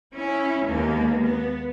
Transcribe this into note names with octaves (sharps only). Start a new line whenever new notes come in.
C#4 E4
D#2 G#3 A#3 B3
B3